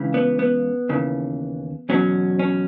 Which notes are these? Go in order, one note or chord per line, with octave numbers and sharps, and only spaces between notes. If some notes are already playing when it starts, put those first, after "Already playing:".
Already playing: C#2 C#3 E3
B3
B3
D#2 C#3 E3
E2 B2 F#3 C#4
C#4